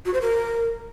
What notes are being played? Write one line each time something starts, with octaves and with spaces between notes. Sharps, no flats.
F#4
C5
A#4